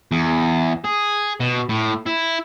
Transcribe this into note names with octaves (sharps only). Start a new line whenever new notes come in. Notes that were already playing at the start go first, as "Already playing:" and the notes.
E2
G#4
B2
A2
E4